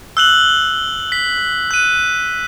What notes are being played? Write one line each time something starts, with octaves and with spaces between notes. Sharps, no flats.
E6 F#6 F#7
B6
F#6 D#7